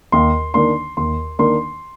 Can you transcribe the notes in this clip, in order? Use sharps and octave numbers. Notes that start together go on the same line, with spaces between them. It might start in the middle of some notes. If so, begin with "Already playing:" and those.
D#2 C6
D#3 A#3 D4 C6
D#2 C6
D#3 A#3 D4 C6